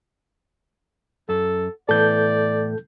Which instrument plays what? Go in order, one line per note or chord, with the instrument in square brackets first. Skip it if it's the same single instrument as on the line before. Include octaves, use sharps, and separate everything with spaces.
[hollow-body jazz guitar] F#2 [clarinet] A4
[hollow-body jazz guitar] A2 E3 B3 [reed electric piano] A4 G6 [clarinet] D5